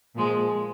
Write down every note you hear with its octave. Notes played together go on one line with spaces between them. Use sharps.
A#2 F3 G#3